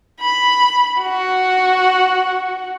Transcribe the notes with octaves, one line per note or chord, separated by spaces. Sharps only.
B5
F#4